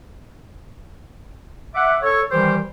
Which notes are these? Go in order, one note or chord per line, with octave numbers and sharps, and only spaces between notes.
E5 F#5 D6
A4 C#5
D#3 E3 G3 G4 C5